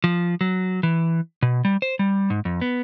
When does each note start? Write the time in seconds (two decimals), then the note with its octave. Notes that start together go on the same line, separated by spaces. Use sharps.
0.04 F3
0.41 F#3
0.83 E3
1.42 B2
1.65 G3
1.82 C5
1.99 G3
2.30 G#2
2.45 F2
2.61 B3